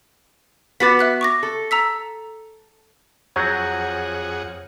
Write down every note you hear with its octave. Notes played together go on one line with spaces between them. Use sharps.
B3 F#4 B4 D6 A6 B6
E5 F#6 B6
C#6 D6 A#6
A4
A#5 E6 B6
F2 F#3 G#4 C#5 F#5 G6 A#6